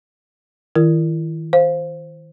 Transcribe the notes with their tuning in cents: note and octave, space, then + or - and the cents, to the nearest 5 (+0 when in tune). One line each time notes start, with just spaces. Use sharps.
D#3 +30 E4 +35 A#4 -10
C5 +0 F5 +0